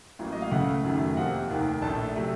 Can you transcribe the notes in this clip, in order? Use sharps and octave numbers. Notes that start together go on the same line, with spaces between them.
A1 A2 F#3 A#3
D#5
F5
C#2 C#3 A3 F#5
F#1 F#2 D#3 F#3 A3
F2 C3 F3 A#3 F#5
F1 D#2 D#3
A#1 A2 A3 A5
C3 F#3 A3